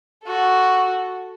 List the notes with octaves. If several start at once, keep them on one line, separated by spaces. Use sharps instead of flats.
F#4 A4